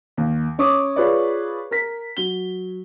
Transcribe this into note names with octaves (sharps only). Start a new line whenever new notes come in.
D#2
C#4 C#5 D6 D#6
F4 G#4 B4 C#5 D5
A#4 B6
F#3 G7